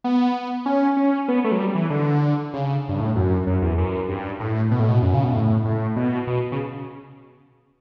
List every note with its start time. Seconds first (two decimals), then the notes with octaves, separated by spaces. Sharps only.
0.04 B3
0.66 C#4
0.97 C#4
1.28 B3
1.44 A3
1.52 F#3
1.59 G3
1.75 E3
1.90 D3
2.54 C#3
2.89 G2
3.00 A2
3.16 F#2
3.47 F#2
3.62 E2
3.78 F#2
4.09 G2
4.40 A2
4.71 B2
4.80 A2
4.88 B2
5.02 F#2
5.14 C#3
5.24 B2
5.33 A2
5.65 A2
5.96 B2
6.27 B2
6.52 C#3